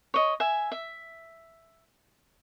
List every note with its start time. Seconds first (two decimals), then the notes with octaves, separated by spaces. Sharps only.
0.14 C#5 D#5
0.40 E5 G#5
0.72 E5